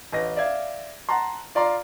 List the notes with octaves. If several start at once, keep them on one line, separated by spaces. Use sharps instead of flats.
A1 D#5 A#6
D5 E5 F5 G#6
F#5 A5 A#5 C6
F4 D5 A#5 C6